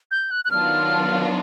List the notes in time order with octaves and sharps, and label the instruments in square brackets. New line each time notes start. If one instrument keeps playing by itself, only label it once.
[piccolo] G6
F#6
F#6
[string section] D#3 F#3 B3 D4 F4 [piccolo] F6